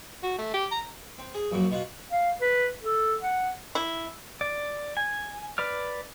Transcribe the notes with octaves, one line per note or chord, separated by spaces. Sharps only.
F#4
A3
G4
A#5
C4
G#4
A#1 F#2 A#2 F#3
B2 F4 F#5
F5
B4
A4
F#5
E4
D5
G#5
B4 D5 F6